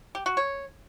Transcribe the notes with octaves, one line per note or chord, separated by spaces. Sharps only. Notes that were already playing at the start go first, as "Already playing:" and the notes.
G4
F#4
C#5